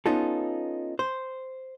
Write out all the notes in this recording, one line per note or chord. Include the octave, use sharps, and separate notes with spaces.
B3 C#4 D#4 F4 A4
C5